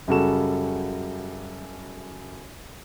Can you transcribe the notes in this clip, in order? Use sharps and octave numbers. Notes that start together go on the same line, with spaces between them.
F#2 C#3 G3 F#4 A4 E7